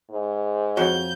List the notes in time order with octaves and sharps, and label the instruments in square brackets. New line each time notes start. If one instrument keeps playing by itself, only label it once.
[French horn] G#2
[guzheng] F2 [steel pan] F#4 C#5 [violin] G6